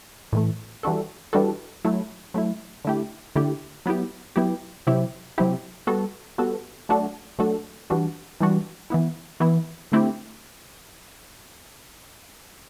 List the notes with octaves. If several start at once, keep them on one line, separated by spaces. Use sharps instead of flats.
A2 E3 A3
E3 G3 D4 F#4 A4
E3 G3 D4 F#4 A4
F#3 A3 E4
F#3 A3 E4
D3 A3 E4 G4
D3 A3 E4 G4
F#3 B3 E4 G4
F#3 B3 E4 G4
C3 F#3 C4 E4 G4
C3 F#3 C4 E4 G4
G3 B3 F#4 A4
G3 B3 F#4 A4
F#3 A3 D4 F#4 A4
F#3 A3 D4 F#4 A4
E3 G3 D4 F#4
E3 G3 D4 F#4
E3 B3 E4
E3 B3 E4
D3 A3 C4 E4 G4